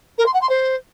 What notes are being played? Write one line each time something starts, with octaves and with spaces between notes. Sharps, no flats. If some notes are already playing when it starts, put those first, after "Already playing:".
A#4
C6
F#5
C6
C5